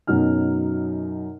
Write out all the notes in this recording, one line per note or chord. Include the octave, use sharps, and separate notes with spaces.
F#2 B2 F#3 D#4 F6